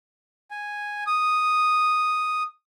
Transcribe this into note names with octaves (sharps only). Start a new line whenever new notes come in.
G#5
D#6